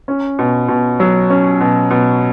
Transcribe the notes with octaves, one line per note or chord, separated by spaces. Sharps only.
C#4
B2
B2
F#3
C#4
B2
B2